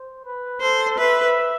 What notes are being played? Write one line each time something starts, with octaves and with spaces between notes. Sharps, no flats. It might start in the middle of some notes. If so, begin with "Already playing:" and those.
Already playing: C5
B4
A4 C5
B4 E5